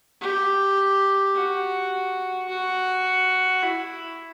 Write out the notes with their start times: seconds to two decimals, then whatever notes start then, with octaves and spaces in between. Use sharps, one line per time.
0.21 G4
1.35 F#4
2.48 F#4
3.63 E4